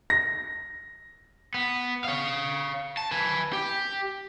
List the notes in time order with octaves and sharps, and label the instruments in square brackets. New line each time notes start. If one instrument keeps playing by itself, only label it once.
[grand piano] A#6
[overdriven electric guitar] B3
C#5 F5
A5
B4 G#5
G4